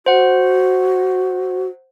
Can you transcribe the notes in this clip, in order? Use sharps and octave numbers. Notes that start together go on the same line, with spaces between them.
F#4 C5 F#5